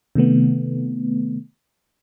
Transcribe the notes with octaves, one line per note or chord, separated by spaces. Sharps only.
C3 D#3 A3 B3